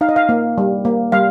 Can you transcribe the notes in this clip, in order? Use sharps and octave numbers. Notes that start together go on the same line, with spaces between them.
D#4 F5
D#5
F5
A#3
G3
A#3
G3 F5